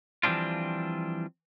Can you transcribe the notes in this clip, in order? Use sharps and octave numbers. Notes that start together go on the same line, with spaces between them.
E3 F3 G3 C4 D4 F4